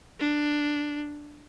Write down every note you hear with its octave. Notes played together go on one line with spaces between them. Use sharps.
D4